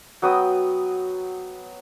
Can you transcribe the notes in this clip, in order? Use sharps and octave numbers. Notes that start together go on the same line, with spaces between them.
F#3 B3 G5 D#6